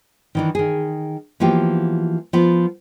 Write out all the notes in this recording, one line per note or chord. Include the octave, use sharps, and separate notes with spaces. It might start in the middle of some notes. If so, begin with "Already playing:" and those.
D#3 E3 D4
D#3 G#4
E3 F3 A#3 B3 F#4 G4
F3 B3